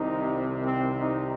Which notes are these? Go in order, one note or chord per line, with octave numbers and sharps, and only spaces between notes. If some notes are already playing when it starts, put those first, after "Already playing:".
Already playing: C2 C3 D#3 D#4
C4
D#4